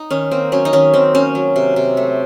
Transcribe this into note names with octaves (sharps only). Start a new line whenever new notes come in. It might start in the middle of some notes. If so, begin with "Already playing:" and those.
Already playing: D#4
D#3 C#4
A#3 C4
F#3 C#4
D#4
D#3 C#4
D#3 C4
A#3 C#4
F#3
C3
C3
A3